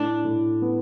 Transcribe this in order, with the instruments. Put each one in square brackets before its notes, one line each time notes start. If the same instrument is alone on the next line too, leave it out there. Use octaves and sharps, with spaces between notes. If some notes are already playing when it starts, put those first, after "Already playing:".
Already playing: [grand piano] A2 [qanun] D4
[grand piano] A2
B3